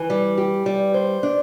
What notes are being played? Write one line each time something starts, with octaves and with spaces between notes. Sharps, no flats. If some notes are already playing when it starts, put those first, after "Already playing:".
Already playing: E3
G3
G4
G3
C5
D4